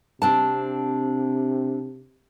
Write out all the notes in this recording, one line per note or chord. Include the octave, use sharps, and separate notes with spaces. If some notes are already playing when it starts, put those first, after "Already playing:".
C3 C4 D4 A5